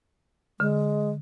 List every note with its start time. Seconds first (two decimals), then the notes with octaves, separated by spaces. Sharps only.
0.60 D3 G#3